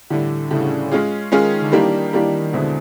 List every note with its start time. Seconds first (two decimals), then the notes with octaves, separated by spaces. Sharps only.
0.10 A2 D3 E3 G3
0.51 A2 C#3 E3 G3
0.92 G#3 C#4 F4 G#4
1.32 D#3 G#3 C#4 F4 G#4
1.62 D3
1.72 D#3 E3 G3 A#3 D4 G4
2.13 E3 G3 A#3 D4 G4
2.53 E2 B2 D3 G#3 C4 E4